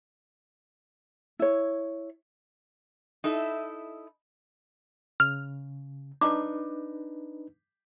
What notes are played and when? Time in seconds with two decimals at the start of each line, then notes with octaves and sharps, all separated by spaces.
1.39 E4 C#5
3.24 D#4 E4 A4 D#5
5.20 C#3 F6
6.21 D4 D#4 B4 D6